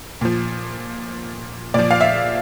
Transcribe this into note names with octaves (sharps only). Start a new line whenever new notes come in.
A#2 F3
A#2 F3 D5
F5
E5